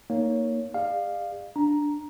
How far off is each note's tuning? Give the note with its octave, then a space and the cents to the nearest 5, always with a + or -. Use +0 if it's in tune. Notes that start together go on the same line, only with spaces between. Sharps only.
A#3 +0 D#4 +0 C#5 +10
G#4 -45 D5 +40 F5 +0
D4 +0 A#5 +5